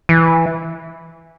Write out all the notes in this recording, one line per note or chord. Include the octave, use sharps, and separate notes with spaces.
E3